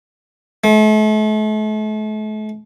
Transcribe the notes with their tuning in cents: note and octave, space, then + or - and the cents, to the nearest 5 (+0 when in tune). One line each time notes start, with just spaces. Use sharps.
A3 -40